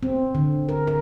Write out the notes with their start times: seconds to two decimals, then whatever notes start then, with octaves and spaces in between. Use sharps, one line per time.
0.03 C4
0.35 D3
0.69 A#4
0.87 A#4